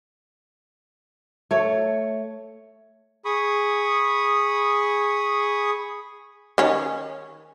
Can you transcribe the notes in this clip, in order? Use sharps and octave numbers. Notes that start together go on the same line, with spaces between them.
A3 C#5
G#4 B5 C#6 D#6
D#3 C#4